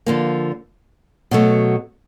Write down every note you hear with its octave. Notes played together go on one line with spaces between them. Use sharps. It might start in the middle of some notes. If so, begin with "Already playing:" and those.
D3 F3 A#3
B2 F#3 A3